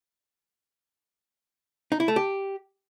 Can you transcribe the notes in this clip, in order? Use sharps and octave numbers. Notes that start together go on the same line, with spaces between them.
D#4
E4
A3
G4